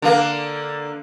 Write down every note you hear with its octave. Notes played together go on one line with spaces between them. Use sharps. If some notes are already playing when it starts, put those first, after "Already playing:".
D3 A#3